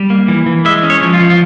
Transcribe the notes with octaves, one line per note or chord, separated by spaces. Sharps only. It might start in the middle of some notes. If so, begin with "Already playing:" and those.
Already playing: G3
A#3
E3
E3
G#3 E5
C#4
C#5
F3
F4
F3
F4